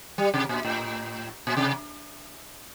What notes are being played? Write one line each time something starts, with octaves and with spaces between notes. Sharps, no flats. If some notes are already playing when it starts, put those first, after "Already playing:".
G3
C3
A#2
A2
A#2
C3